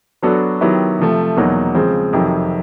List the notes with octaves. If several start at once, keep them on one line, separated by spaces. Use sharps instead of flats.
F#3 B3 D4 F#4 A4
D#3 F#3 B3 E4 G4
C3 F3 A3
E2 B2 F#3 A#3 D#4
C#3 F3 G#3 C4
F2 C3 D#3 F#3